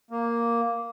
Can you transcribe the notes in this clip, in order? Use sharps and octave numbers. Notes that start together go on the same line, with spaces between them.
A#3